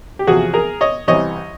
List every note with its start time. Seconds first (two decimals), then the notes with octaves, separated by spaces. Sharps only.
0.19 G4
0.27 E2 C3 F3 F#4 G#4
0.54 G#4 A#4
0.81 C#5 D#5
1.08 C2 C3 E3 C#5 D#5